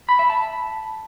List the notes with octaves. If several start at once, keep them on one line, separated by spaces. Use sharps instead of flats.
B5
E5
A5